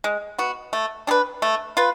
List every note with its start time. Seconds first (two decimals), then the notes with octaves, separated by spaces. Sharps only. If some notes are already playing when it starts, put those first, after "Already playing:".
0.04 G#3
0.38 B3 F#4
0.73 A3
1.07 D4 G#4 B4
1.42 A3
1.77 F4 B4